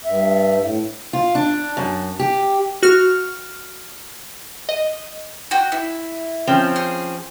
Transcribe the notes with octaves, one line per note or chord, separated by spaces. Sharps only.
G2 E5
A2
F4
D4
F#2
G4
F#4 F6
D#5
F#4 G5
E4
F3 C4 C#4
G#4